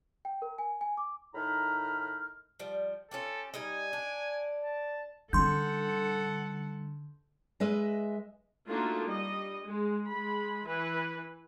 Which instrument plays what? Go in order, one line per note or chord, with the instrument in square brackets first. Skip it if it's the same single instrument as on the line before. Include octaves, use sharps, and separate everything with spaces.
[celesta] G5
A#4
G#5
G#5
D6
[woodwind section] A2 D#3 D#4 A#5 B5 F6
[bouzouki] F3 G3
[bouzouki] C#4 F4 G4 [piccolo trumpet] A4
[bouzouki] G3 D#4 D#5 [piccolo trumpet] G#5
[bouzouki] D4
[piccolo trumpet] A5
[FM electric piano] D3 [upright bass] G3 C#4 [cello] A4 F#5 [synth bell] C6 G6
[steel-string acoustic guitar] G#3 B4 D#5 E5
[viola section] A3 A#3 D4 D#4 F4 F#4
G3 D#5
G#3
G#3 B5
E3 B4